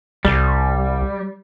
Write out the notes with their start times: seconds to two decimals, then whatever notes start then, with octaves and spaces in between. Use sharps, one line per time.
0.25 C2 G3